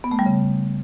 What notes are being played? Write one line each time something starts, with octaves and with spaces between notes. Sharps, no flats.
B3
A3
G3
C#3